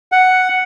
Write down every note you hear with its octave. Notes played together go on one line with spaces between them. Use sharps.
F#5